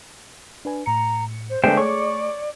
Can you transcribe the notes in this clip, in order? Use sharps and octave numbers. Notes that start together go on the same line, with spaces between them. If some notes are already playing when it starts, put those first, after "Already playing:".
D4 B4 G#5
A2 A#5 C#7
C5
D3 G#3 A3 B4 C5 D5 E5 G5
A3 G#4 C#5 C#6 D6